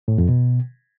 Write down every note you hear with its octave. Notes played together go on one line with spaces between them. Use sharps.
A2
F2
B2